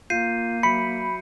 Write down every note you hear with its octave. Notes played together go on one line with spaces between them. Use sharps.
A#3 F4 G6 C7 D#7
F#3 E5 B5 C#7